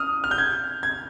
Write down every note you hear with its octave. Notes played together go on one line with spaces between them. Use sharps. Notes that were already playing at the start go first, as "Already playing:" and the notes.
Already playing: D#6 F6
F6
G6
G#6
G#6